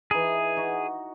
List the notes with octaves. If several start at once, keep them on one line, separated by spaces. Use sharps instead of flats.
E3 D#4 G#4
D#4 F#4 D#5